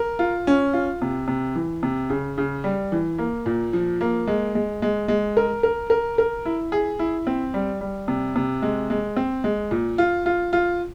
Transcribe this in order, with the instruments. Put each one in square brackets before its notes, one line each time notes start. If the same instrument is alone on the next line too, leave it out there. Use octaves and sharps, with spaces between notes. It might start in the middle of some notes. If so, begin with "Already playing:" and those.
Already playing: [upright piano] A#4
F4
C#4
F4
C3
C3
E3
C3
C#3
C#3
G3
E3
A#3
A#2
F3
A#3
G#3
G#3
G#3
G#3
A#4
A#4
A#4
A#4
E4
G#4
E4
C4
G3
G3
C3
C3
G#3
G#3
C4
G#3
A#2
F4
F4
F4